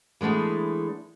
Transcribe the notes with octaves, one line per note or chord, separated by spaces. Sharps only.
E3 G#3 A3 B3 D4